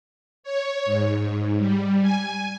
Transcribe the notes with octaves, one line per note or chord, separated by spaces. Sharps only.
C#5
G#2
G3
G#5